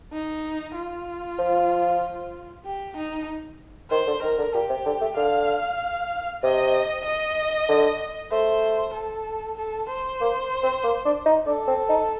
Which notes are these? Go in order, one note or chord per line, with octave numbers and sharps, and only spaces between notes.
D#4
F4
F3
G4
D#4
D#3 C5
D3
D#3 A#4
D3
A#2 G4
C3
D3
A3
D3 F5
C3 D#5
D#5
D3
A3 C5
A4
A4
C5
A#3
C4
A#3
D4
D#4
D4 A4
C4
D#4